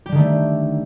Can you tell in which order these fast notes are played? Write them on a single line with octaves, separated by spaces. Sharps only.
G4 G3 D3 D#3 A3